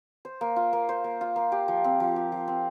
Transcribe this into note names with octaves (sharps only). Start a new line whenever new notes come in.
C5
A#3
F4
A#3
C5
A#3
F4
A#3
G4
F3
C4
F3
G4
F3
C4